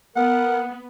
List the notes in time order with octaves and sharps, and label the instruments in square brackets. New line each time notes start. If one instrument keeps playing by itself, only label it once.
[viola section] B3 [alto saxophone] A#4 [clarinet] F#5